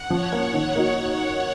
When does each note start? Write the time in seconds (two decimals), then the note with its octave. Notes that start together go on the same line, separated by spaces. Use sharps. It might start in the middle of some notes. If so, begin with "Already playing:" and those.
Already playing: F#5
0.10 F3 C#5
0.32 A#3 C#4
0.54 D#3
0.75 A#3 D#4 F#4